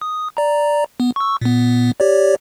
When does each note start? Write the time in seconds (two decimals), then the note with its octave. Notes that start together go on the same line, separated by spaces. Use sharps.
0.01 D#6
0.37 D5 A#5
1.00 B3
1.16 C#6 E6
1.41 A#2 B3
2.00 G4 C#5 D5